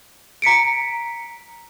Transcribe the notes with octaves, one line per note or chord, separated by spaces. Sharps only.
A#5 B6 C#7 D7